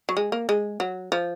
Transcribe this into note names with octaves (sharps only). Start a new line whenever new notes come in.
F#3
G#3
A#3
G#3
F#3
F3